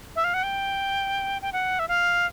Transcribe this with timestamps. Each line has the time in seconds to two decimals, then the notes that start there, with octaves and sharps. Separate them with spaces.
0.16 E5
0.24 F5
0.34 F#5
0.43 G5
1.42 G5
1.53 F#5
1.79 E5
1.88 F5